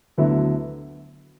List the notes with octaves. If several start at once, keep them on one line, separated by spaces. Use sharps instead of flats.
D2 D3 F#3 B3 E4